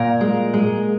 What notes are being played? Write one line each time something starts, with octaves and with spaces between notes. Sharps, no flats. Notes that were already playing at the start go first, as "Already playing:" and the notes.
Already playing: A#2 A#4
G#3
G#3